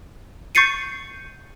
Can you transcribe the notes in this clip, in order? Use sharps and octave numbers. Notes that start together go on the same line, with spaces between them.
C#6 G6 A6 C7 C#7 D#7